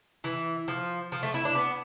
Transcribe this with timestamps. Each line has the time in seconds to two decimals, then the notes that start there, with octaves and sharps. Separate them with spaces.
0.24 E3
0.68 F3
1.12 F3
1.23 A3
1.34 E4
1.45 D4
1.55 B3